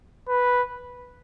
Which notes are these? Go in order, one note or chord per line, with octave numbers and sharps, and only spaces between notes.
B4